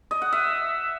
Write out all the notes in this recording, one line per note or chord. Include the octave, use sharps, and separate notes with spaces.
D#5
F#5
E5